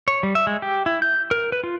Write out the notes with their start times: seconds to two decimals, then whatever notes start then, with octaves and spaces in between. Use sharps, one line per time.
0.08 C#5
0.23 G3
0.35 E5
0.47 G#3
0.62 G4
0.86 E4
1.02 G6
1.31 A#4
1.52 B4
1.64 F4